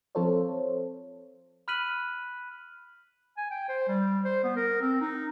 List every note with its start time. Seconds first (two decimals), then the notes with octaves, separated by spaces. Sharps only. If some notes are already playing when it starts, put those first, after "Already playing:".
0.15 F3 C4 F4 A4 C5 C#5
1.68 B5 F6 F#6 B6 D#7 F#7
3.38 G#5
3.51 G5
3.69 C5
3.88 G3
4.25 C5
4.44 B3
4.57 A#4
4.81 C4
5.01 D#4